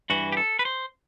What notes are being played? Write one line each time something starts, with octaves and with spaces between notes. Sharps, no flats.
G2 E3 F#4
G4
A4
B4
C5